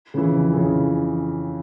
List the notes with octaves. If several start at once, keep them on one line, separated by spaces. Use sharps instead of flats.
C#3 E3
F2
C#3 E3